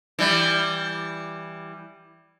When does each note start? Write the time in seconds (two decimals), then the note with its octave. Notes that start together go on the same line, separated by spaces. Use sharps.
0.19 E3 G3